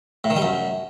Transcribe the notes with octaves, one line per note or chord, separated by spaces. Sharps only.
A2
D#3
G3
F#2